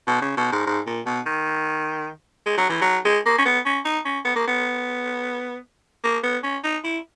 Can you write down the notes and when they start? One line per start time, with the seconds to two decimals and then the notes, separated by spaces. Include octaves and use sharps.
0.07 B2
0.22 C#3
0.37 B2
0.52 G#2
0.66 G#2
0.87 A#2
1.06 B2
1.26 D#3
2.46 G#3
2.57 F#3
2.69 E3
2.81 F#3
3.05 G#3
3.26 A#3
3.38 C#4
3.45 B3
3.66 C#4
3.85 D#4
4.05 C#4
4.25 B3
4.35 A#3
4.48 B3
6.04 A#3
6.23 B3
6.43 C#4
6.64 D#4
6.84 E4